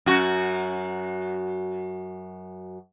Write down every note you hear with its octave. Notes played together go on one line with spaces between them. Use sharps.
F#2 F#4